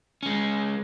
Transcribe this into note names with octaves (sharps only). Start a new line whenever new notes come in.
G#3 C#4